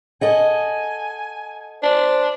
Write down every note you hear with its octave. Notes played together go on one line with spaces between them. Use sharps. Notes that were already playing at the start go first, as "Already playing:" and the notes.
A4 D#5 F#5 G#5
D4 C5